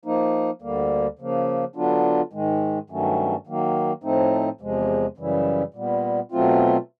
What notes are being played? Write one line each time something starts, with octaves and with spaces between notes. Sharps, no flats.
F3 A#3 D#4
D2 D3 G3 A#3
C#3 F3 A#3
D3 F#3 B3 D4 F4
G#2 D#3 G#3
G2 D#3 F#3 A3 C#4
D#3 F#3 A#3
A2 F3 A3 C4 D#4
E2 C3 F3 G#3
F#2 C#3 E3 G3
A#2 G3 B3
B2 F#3 A3 C4 F4